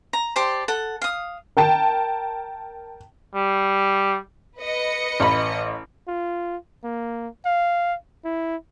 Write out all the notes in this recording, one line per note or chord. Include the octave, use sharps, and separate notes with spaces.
A#5
G4 C5 D5 A5
A4 F#5
F5 D#6
A#4 G5 A5
G3
B4 D#5 C#7
A1 B5
F4
A#3
F5
E4